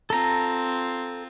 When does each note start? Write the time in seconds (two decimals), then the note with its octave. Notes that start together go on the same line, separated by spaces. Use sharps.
0.10 C4 F4 A4 A#5